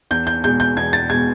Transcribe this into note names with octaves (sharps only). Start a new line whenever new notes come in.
E2 G6
G6
B2 G#3 G6
G6
E2 G#6
A6
B2 G#3 G#6